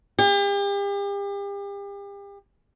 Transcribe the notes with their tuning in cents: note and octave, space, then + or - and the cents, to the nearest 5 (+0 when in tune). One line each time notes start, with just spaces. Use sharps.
G4 +40